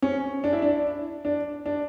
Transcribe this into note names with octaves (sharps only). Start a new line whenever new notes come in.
C#4
D4
E4
D4
D4
D4